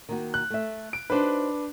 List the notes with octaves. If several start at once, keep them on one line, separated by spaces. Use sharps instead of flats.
D#3 A#3 F#4
F#6
A3 E5
D7
D4 D#4 F#4 B4 C5